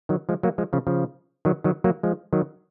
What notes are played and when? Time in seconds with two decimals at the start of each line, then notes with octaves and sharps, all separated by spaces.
0.09 D#3 F#3
0.29 F3 G#3
0.43 F#3 A#3
0.58 F3 G#3
0.73 C#3 F3
0.87 C#3 F3
1.45 D#3 F#3
1.64 D#3 F#3
1.84 F#3 A#3
2.03 F3 G#3
2.33 D#3 F#3